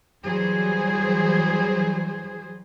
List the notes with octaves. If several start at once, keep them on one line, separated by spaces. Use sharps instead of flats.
E3 F#3 G3 G#4 C5